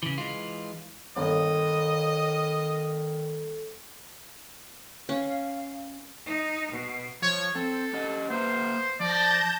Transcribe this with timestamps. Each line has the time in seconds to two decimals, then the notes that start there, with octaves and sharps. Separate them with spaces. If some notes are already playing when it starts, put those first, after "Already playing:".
0.03 C#3 E3
0.18 E3 G#3 F4
1.16 G1 D#3 A4 D#5
5.09 C#4 F5
6.26 D#4
6.73 B2
7.22 F3 C#5
7.55 C4 A4
7.93 C#4 G4 D#5
8.30 A#3 B4 C5 E5
9.00 F3 D5 A5 G6 A#6